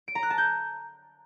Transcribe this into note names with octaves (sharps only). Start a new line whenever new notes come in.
D7
A#5
F#6
A5
G6